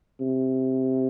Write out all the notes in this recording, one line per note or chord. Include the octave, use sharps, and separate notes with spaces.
C3